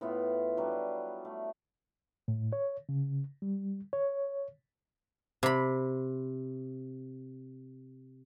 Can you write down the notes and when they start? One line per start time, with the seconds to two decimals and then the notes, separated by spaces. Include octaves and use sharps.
0.01 A2 B3 F4 E5
0.57 F#3 G3 D4
1.25 A3
2.28 A2
2.53 C#5
2.89 C#3
3.42 G3
3.93 C#5
5.43 C3 B5